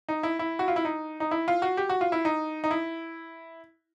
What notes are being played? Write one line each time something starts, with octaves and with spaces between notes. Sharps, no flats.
D#4
E4
E4
F#4
F4
E4
D#4
D#4
E4
F4
F#4
G4
F#4
F4
E4
D#4
D#4
E4